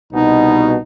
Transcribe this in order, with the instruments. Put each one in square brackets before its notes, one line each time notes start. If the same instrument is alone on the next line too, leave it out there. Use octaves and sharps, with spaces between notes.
[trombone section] C2 B2 [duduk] D#4